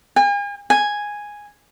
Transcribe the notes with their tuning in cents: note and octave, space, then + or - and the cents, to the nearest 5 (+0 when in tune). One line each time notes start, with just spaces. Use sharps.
G#5 -40
G#5 -5